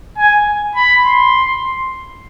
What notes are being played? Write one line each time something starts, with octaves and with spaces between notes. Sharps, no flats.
G#5
B5
C6